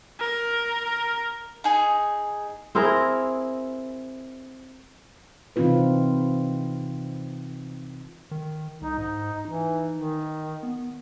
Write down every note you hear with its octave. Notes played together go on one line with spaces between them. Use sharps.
A#4
D#4 G#4
C4 E4 G#4 A#4
C3 E3 C4 D#4 F4 B4
D#3
C2 D#4
G#2 D#4
E3 D#4
D#3
B3